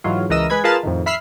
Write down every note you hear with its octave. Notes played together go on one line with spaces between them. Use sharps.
G#2 E3 F#3 F4
C#2 E3 A#4 D#5 E6
G#3 B4 B5 G#6
F4 G#4 A#4 B4 F5 A5
F2 A2 D#3
E5 B5 F6 C7